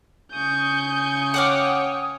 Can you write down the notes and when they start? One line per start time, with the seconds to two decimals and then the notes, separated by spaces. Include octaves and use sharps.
0.33 C#3 G#5 C#6 D#6 G6
1.34 C#5 F#5 G5 D6 F6